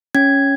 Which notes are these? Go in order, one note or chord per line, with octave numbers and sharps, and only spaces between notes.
C#4 G#6